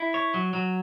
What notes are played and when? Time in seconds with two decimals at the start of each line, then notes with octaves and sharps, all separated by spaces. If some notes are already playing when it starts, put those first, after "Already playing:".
Already playing: E4
0.14 C#5
0.34 F#3
0.53 F#3